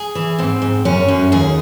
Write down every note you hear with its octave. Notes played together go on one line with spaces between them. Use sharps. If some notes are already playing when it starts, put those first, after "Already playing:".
Already playing: G#4
E3
G#2 C4
G#2
F#2 C#4
F#2
D#2 G#4